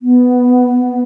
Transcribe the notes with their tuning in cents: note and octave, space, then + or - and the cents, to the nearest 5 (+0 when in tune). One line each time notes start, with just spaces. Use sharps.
B3 +5